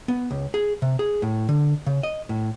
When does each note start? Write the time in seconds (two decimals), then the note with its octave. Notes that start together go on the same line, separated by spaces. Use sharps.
0.08 B3
0.31 C#2
0.54 G#4
0.82 C3
0.99 G#4
1.22 A2
1.49 D3
1.86 C#3
2.03 D#5
2.29 A2